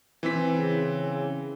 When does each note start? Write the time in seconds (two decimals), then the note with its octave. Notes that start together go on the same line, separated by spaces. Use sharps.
0.23 E3 C4 B6
0.57 C#3